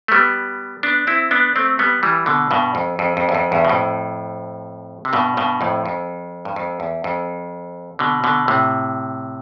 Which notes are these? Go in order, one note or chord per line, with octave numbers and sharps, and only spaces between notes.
A3
G3 B3
B3 D4
C4 E4
B3 D4
A3 C4
G3 B3
E3 G3
B2 D3
G2 B2
F2
F2
F2
E2
F2
E2 G2
B2
F2 A2
C3
G2 B2
G2 B2
F2 A2
F2
G2
F2
E2
F2
B2 D3
B2 D3
A2 C3